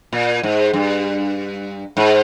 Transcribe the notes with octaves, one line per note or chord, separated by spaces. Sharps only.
A#2
G#2
G2
G#2